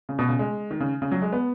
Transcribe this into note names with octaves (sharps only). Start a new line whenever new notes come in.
C#3
B2
C#3
G#3
D#3
C#3
C#3
F#3
G#3
B3